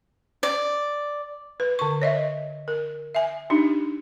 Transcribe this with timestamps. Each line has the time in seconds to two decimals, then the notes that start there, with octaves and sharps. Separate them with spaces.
0.43 D5
1.60 B4
1.79 D3 C#6
2.02 C#5 D#5 E5
2.68 A#4
3.15 E5 G#5
3.50 D4 D#4 G4